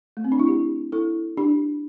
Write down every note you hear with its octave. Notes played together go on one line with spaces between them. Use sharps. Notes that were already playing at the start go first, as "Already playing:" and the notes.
A3
C4
D4
E4
D4 G4
E4 A4
D4 G4